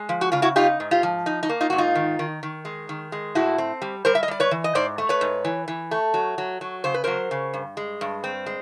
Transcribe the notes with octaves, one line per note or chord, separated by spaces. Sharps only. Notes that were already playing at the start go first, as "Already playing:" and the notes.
Already playing: G#3
F3
F#4
C#3 F4
E4 F#4
D#4 F4 G4
G#2
F4 G4
F3
D#4
D#4
A#3
D#4 F4
G#2 F#4
D#4 F4
D#3
D#3
D#3
G#3
D#3
G#3
A2 E4 F#4
C4
G3
G3 A#4 C5
E5
D#5
G3 D5
B4 C#5
E3
D#5
G#2 C5 D5
A3
B4 C#5
G#2
E3
E3
A3
F#3
F#3
F#3
C#3 C5
B4
F#3 A#4 C5
C#3
G2
G#3
G2
C4
G#3